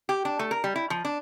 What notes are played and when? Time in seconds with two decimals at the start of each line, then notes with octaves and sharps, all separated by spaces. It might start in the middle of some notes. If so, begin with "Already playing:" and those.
0.09 G4
0.25 D4
0.39 A3
0.51 A#4
0.64 G3
0.76 E4
0.90 F3
1.05 D4